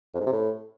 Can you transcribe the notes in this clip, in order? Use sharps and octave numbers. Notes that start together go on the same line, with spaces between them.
F2
G#2
C3
A2